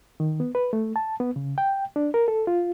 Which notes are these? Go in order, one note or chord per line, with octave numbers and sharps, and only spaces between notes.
D#3
B3
B4
A3
A5
B3
C#3
G5
D4
A#4
A4
F4